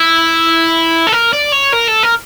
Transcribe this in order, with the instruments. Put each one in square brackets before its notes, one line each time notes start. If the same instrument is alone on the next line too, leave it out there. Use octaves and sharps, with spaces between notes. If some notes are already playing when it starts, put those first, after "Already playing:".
Already playing: [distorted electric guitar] E4
A4
A#4
D5
C#5
A#4
A4
A#4